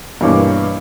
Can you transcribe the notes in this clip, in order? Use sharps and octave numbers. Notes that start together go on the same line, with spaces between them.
G2 B2 E3 A#3 C#5 D6